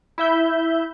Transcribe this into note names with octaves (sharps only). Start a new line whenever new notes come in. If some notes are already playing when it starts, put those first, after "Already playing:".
E4 E5 G6